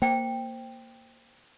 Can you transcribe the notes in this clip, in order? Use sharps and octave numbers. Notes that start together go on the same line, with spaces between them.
A#3 C5 G5